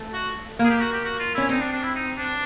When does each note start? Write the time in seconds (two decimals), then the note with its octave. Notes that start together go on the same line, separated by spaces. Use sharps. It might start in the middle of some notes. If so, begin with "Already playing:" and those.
Already playing: A3
0.13 F#4
0.59 A#3
0.64 G#4
0.70 G4
0.81 F#4
0.93 G4
1.04 F#4
1.19 F4
1.34 C#4 E4
1.49 C4 D#4
1.61 D4
1.72 D4
1.83 E4
1.95 D#4
2.17 D4